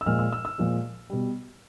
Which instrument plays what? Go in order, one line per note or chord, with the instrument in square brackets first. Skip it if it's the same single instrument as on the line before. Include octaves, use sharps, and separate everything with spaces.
[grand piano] E6
A#2 F3 G#3 F6
E6
E6
E6
A#2 F3 G#3
B2 G3